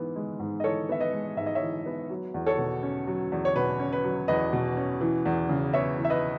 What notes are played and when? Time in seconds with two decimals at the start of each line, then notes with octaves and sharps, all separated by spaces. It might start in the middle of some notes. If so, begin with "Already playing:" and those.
Already playing: G#2 E3 B3
0.16 G#3
0.40 G#2
0.60 D#5
0.64 E3 A4 C#5
0.89 B3 E5
1.00 B4 D#5
1.13 G#3
1.37 G#2 E5
1.46 D#5
1.55 C#5 E5
1.61 E3
1.86 B3
2.10 F#3
2.34 E2
2.46 A4 C#5
2.58 B2
2.83 C#4
3.07 F#3
3.32 E2
3.45 C#5
3.56 B2 B4
3.80 C#4
3.93 B4
4.04 F#3
4.28 E2 B4 D#5
4.53 B2
4.77 C#4
5.01 E3
5.25 E2
5.49 C#3
5.74 B3 C#5 E5
5.98 E3
6.05 E5
6.10 B4 D#5